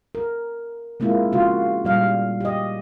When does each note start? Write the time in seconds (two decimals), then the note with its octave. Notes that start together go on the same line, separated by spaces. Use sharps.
0.15 A#4
1.00 G#3 A#3 C4 E4 F4
1.32 C#3 F4 F#4
1.85 A#2 G3 F5
2.41 G4 D#5